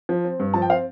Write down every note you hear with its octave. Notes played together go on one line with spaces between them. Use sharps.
F3
C4
G2
F3 A5
G5
C4 F5